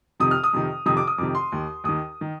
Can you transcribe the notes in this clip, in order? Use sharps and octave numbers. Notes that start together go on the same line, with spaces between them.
F2 C3 D#3 D#6
F6
D#6
F2 C3 D#3
F2 C3 D#3 D#6
D6
D#6
F2 C3 D#3 D6
C6
D#2 D#3
D#2 D#3 D#6
D#3